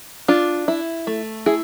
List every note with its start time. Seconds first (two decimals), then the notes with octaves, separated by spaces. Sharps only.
0.28 D4 F4
0.68 E4
1.07 A3
1.46 E4 G#4